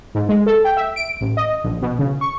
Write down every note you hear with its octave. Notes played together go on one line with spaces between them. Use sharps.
G#2
G#3
A4
G5
E5
D7
A1
D#5
A#1
B2
C#3
C#6